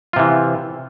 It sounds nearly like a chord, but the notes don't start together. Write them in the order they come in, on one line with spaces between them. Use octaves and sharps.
F4 C3 E3